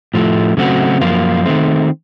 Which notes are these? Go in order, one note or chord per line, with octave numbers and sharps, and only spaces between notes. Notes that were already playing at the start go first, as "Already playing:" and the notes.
A2 F3 A3
C#3 F#3 A3 C4 F#4
F#2 F3 A#3 F4
D#3 A3 C4